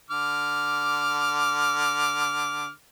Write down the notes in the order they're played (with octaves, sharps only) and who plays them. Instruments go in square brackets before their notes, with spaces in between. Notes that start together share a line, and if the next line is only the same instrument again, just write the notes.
[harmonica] D3 D6 F6